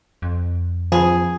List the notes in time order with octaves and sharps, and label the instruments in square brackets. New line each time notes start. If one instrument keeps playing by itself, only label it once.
[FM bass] F2
[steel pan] F3 [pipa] G#4